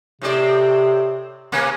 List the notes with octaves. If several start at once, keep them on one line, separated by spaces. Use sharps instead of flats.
A2 C3 C4 D5
C3 A#3 B3